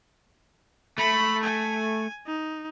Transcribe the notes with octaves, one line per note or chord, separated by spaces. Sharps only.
A3 B5
G#5
D#4